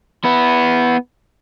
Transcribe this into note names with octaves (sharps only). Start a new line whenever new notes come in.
B3 E4